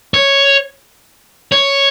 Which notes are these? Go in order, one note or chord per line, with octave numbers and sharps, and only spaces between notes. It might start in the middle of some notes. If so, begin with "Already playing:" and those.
C#5
C#5